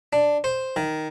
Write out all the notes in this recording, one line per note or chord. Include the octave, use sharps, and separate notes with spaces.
D4
C5
D#3